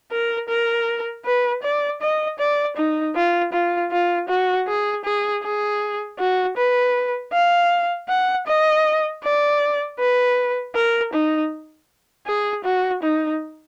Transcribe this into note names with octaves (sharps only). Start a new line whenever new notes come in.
A#4
A#4
B4
D5
D#5
D5
D#4
F4
F4
F4
F#4
G#4
G#4
G#4
F#4
B4
F5
F#5
D#5
D5
B4
A#4
D#4
G#4
F#4
D#4